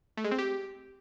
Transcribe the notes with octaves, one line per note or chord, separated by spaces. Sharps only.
A3
G#3
C4
G4